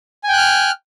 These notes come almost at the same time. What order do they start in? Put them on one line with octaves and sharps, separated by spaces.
G#5 G5 F#6 F6